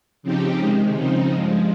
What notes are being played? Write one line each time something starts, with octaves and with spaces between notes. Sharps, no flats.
C#3 F3 C4 D#4 G4
C3 D#3 G#3
C#3 F3 C4 D#4
G2 F3 G#3